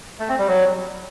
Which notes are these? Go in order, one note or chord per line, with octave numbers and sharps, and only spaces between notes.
A3
C4
G3
F#3